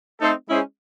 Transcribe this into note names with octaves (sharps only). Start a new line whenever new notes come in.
A3 C4 D#4 A4 C5
G#3 C#4 E4 G#4 C5